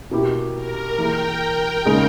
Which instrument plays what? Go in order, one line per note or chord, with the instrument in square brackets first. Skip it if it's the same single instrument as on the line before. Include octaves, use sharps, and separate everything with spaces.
[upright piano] B2 A#3 E4 G4
[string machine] A#4
[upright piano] E3 A#3 E4 G#4 [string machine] G5
[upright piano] C#3 G#3 D#4 G#4